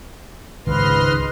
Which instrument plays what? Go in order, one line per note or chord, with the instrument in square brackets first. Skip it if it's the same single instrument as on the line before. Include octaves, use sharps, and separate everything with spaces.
[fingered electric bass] G#1 C#2 C#3 [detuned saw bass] G#2 [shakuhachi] B4 [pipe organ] D#5 C6 F6